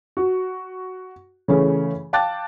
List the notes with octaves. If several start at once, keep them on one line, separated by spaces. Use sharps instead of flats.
F#4
C#3 E3 A3 C#4 G#4
F5 G5 A5 D6 F#6 A6